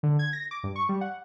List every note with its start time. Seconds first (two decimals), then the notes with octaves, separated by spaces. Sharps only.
0.03 D3
0.19 G#6
0.33 A#6
0.51 D6
0.63 G2
0.76 C#6
0.89 G3
1.01 F#5